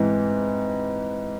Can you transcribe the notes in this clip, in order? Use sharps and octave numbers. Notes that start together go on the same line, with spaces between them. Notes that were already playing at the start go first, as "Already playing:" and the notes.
Already playing: G#2 E3 C4